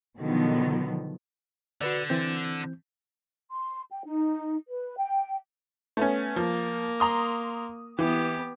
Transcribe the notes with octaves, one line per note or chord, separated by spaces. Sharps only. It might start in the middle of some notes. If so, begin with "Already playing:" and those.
B2 D3 D#3 F3 F#3 B3
D3 F#4 B4 D5
E3 C4 G6
C6
G5
D#4
B4
G5
A3 B3 C#4
F3 A#3
A#5 C6 D#6
E3 B3 G4